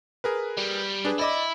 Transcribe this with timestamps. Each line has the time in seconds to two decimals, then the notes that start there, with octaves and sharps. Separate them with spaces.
0.24 G#4 A#4 B4
0.58 G3
1.05 D4 G#4 B4
1.19 E4 D5 D#5 D6